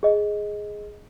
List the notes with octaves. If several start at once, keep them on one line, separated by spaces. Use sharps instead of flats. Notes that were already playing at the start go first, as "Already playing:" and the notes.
G#4 D#5